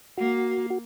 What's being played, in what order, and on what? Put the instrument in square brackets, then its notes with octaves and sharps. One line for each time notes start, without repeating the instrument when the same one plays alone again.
[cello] A#3 [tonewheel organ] F#4
[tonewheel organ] F#4